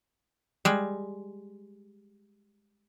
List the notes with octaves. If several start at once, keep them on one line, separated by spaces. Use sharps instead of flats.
G3 G#3